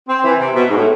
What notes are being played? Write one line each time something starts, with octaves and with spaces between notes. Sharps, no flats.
C4
E3
C3
B2
G#2
A2